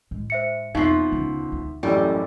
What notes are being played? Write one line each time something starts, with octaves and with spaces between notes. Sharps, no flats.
A2 G#3
C5 E5 C#7
E2 B2 F3 C4 D#4 E5 C7
D2 C#3
D2
A1 F#2 A2 G3